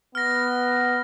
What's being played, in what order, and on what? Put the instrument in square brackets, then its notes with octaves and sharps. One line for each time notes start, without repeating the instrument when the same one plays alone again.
[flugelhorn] B3 [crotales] F6 A#6